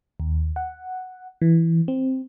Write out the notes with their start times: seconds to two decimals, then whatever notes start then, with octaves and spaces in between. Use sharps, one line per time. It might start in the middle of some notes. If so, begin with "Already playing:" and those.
0.20 D#2
0.56 F#5
1.42 E3
1.88 C4